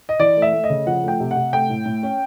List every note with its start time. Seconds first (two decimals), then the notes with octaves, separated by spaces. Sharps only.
0.09 D#5
0.19 E3 D5
0.37 A3
0.42 E5
0.53 A3
0.64 D#5
0.70 C#3
0.87 F3 F#5
1.03 A3 G5
1.20 C3
1.31 F#5
1.36 C3
1.53 A3 G5
1.70 A2
1.86 A2
2.03 C#4